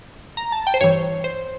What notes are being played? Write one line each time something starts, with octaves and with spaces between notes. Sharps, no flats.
A#5
A5
G5
C5
G2 E3 C#5
C5